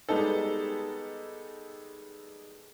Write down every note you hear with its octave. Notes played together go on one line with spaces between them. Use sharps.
G3 G#3 B3 D#4 A4